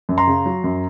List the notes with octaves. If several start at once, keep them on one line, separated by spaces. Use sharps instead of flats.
F#2
A#5 C6
C#3
F#3
F#2